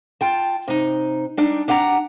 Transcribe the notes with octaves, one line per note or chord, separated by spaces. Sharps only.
F4 G5 A5
C3 D#4
G3 D4 D#4
D4 G4 F#5 G#5 A#5